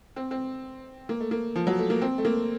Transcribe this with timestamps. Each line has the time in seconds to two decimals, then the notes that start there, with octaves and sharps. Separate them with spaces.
0.16 C4
0.31 C4
1.09 A#3
1.20 A3
1.31 A#3
1.56 F3
1.67 F#3
1.79 A3
1.90 A#3
2.02 C4
2.18 A3
2.25 A#3